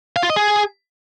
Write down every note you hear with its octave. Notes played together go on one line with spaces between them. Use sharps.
F5
F4
D#5
G#4